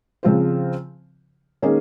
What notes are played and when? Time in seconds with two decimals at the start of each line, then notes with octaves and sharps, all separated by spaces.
0.23 C#3 F3 C4 F4 C5
1.62 D#3 A#3 C#4 G#4 D#5